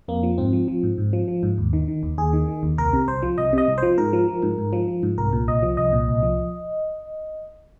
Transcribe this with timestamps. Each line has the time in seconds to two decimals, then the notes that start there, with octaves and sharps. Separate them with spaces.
0.08 F2 A#3
0.23 F3
0.38 G#2 C4
0.53 F3
0.68 F3
0.83 G#2
0.98 G#2
1.13 F3
1.28 F3
1.43 G#2
1.58 D#2
1.73 D#3
1.88 D#3
2.03 D#2
2.18 D#2 G#4
2.33 D#3
2.48 D#3
2.63 D#2
2.78 C2 A#4
2.93 C3
3.08 C2 C5
3.22 F3
3.38 C2 D#5
3.53 C3 D#5
3.68 C2
3.78 F3 C5
3.98 G#2 A#4
4.13 F3
4.28 F3
4.42 G#2
4.58 G#2
4.73 F3
4.88 F3
5.03 G#2
5.18 C2 A#4
5.33 A#2
5.48 C2 D#5
5.63 F3
5.77 C2 D#5
5.93 A#2
6.08 C2
6.23 F3